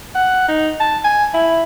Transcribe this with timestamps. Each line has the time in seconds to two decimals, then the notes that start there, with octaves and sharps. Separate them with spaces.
0.15 F#5
0.48 D#4
0.80 A5
1.04 G#5
1.34 E4